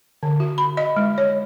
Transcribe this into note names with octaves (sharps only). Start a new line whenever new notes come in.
D3
F#4
B5
D#5
G#3
C#5